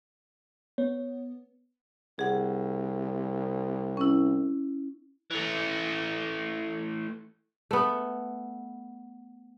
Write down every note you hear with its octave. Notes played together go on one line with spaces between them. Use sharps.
B3 C#5
C2 G#4 F#5
C#4 E4
E3 A3
A3 B3